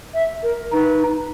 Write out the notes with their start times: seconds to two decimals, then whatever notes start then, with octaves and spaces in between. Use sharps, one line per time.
0.14 E5
0.43 A#4
0.72 D#4 B4